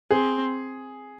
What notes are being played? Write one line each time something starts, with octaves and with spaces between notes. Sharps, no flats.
C4 G#4